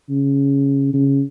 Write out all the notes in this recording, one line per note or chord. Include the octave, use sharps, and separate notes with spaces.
C#3
C#3